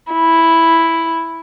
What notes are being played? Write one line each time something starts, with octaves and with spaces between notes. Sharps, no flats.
E4